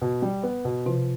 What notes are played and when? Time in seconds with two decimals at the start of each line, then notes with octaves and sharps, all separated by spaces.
0.02 B2
0.22 G3
0.43 B3
0.65 B2
0.86 C3 F3